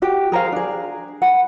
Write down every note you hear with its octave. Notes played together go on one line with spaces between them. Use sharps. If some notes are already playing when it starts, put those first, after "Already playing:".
F#4 G4 G5
G#4 A#4 C5 F5
D4 G#4
F#5 B5